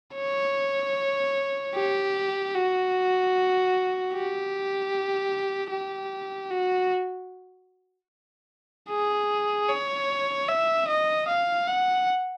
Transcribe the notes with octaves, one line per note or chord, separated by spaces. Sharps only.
C#5
G4
F#4
G4
G4
F#4
G#4
C#5
E5
D#5
F5
F#5